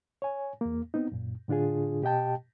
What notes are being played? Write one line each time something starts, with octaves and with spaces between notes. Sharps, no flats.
C#5 G#5
E2 A#3
B3 C4 D#4
F#2 A#2
A2 D3 D4 F4 G#4
B2 G4 D#5 G5 A5